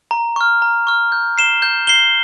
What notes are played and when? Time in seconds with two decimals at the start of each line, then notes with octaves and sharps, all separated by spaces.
0.11 A#5
0.36 C#6 F6
0.62 A#5
0.87 C#6 F6
1.12 G6
1.38 C7 E7 G7
1.62 G6
1.87 C7 E7 G7